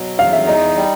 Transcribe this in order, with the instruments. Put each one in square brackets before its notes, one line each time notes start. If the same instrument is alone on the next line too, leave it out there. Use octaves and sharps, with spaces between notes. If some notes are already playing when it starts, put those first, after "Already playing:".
Already playing: [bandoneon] B2 F#3
[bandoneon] E2 [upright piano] F5
[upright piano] E5
[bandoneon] D#4 [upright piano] D#5
[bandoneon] G3